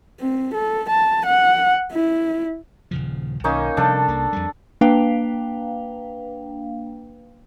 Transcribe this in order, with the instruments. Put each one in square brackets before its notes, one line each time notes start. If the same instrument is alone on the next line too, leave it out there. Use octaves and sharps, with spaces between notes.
[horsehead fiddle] C4
A4
A5
F#5
E4
[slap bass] D#1 C#3 F3
[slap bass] B1 D#3 [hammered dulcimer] A#3 C#4 D#4
[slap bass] C3 F3 G3 [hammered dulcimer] D4 A4
[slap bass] C2 A#3
F2 G3
[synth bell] A#3 D4 B4 F5 G5